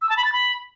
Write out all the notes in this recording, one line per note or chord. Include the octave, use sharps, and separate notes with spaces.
E6
A5
B5
A6
B5